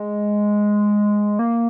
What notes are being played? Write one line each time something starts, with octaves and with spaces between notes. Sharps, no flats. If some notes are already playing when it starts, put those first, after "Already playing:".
Already playing: G#3
A#3